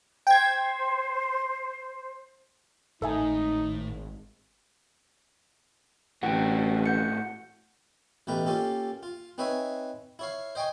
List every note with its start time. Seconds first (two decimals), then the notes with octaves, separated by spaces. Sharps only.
0.27 C5 G5 G#6
3.02 G#1 A2 D#4 A4 E5 G#5
6.23 A1 A2 F#4 F#5 G5
6.86 F#5 G6 C#7
8.27 A1 B2 A3 G4 B4 A#5
8.46 A#3 C#4 F4 G4 A4
9.03 F4
9.38 C4 D#4 B4 C#5 E5 G#5
10.19 E4 C#5 F5
10.55 C5 D#5 G5 G#5 C#6